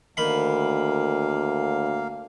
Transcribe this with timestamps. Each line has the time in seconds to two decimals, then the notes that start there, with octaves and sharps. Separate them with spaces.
0.17 D2 D#3 A#3 F5 B5 C6